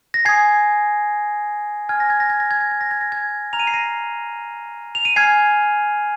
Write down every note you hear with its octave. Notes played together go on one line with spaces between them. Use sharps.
A#6
G#5 D#6 G#6 C7
G#5 F6 G#6
A#6
G#6
A#6
G#6
A#6
G#6
A#6
G#6
A#6
G#6
A#6
G#6
A#5 F6 F7
D#7
C7
A#6 D#7
F7
D#7
G#5 F6 G#6 C7